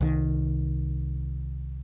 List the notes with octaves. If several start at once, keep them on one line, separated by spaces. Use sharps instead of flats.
C2 D#3